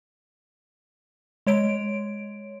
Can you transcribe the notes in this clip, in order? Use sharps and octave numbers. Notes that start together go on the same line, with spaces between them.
G#3 C#5 D7